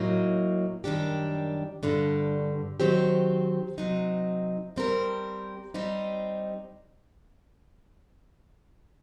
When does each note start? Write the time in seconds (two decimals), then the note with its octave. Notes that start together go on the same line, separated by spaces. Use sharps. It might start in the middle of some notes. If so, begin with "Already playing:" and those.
Already playing: A2 F#3 A#3 D#4
0.84 F#2 D#3 G3 D4 G4
1.83 G2 D3 G3
2.80 D#3 F#3 C4 G4 C5
3.78 C3 F#3 C4 D#4
4.76 G3 C4 G4 A#4
5.74 G3 C4 D#4 G4